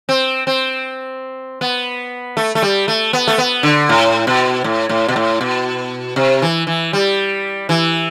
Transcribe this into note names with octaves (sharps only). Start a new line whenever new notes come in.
C4
C4
B3
A3
A3
G3
A3
B3
A3
B3
D3
A2
B2
A2
A2
B2
A2
B2
C3
E3
E3
G3
E3